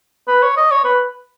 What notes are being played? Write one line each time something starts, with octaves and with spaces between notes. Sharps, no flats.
B4
C#5
D#5
C#5
B4